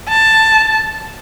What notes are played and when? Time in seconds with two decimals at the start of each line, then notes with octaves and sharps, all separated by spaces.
0.08 A5